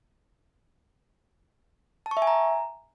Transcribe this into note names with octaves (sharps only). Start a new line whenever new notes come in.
A5
C#6
E5
G#5
A#5